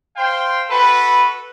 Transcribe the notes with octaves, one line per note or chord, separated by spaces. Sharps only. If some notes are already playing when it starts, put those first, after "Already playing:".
C5 F5 G5 C6
F#4 A4 B4